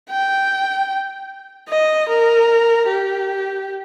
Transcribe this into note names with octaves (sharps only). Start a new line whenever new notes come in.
G5
D#5
A#4
G4